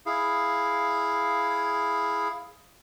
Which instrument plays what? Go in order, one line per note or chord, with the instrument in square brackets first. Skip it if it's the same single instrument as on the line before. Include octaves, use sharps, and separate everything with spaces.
[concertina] E4 G#4 F5